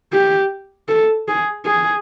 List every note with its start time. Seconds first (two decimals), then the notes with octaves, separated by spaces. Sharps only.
0.13 G4
0.89 A4
1.28 G#4
1.66 G#4